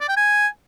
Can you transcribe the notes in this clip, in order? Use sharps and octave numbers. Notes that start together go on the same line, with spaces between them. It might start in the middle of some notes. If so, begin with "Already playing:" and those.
D5
G5
G#5